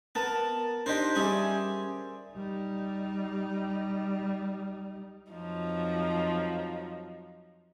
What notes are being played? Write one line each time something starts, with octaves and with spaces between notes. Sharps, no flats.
B3 A#4 A5
D4 D#4 G4 C5
G3 C#4 G#4 D5 E5
G3 D#4
F2 F3 F#3 D#4